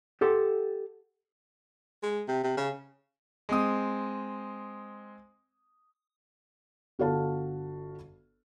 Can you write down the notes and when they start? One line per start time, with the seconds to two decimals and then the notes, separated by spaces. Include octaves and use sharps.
0.21 G4 A4 F#5 C6
2.03 G#3
2.28 C3
2.43 C3
2.57 C#3
3.49 G#3 C4 D#6
6.99 G1 F#4 A4 C#5 F5 A5